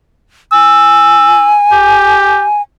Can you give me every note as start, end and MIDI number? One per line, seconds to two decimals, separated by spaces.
0.52 2.62 80
0.52 1.54 88
1.72 2.44 67